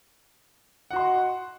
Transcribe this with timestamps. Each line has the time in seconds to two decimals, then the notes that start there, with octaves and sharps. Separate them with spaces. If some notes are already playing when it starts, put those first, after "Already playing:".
0.91 F#5
0.93 F#4
0.96 C6
0.99 D#5